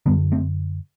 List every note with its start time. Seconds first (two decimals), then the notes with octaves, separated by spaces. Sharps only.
0.06 F#2 D3 G3 B3
0.32 A3 C4